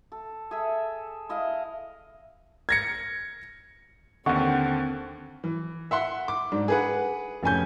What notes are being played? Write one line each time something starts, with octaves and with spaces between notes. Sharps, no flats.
A4
G#4 A4 E5
E4 D#5 F5
G#6 A#6 C#7
D#2 D3 C4 F#5 C#6
E3
E5 F#5 C6
D6
G#2 D4
G#4 B4 F#5
F1 C#4 G#5 G6